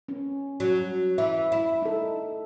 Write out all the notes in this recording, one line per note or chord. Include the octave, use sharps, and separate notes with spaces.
C#4
F#3
E3 E5
E4
D#4 A4